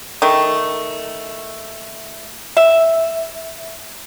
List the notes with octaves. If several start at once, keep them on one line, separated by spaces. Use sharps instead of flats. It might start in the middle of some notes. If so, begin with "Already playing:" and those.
D#3 A3
E5